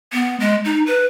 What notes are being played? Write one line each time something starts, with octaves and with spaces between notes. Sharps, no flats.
B3
G#3
D#4
B4